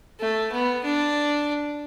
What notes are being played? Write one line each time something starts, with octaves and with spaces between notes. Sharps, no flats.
A3
B3
D4